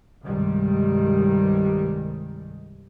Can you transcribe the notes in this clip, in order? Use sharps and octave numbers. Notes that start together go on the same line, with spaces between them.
C2 G2 D#3 G3 G#3